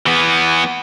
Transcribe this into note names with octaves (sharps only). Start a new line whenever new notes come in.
E3 B3